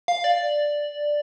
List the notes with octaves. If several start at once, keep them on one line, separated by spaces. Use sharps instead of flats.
F5
D5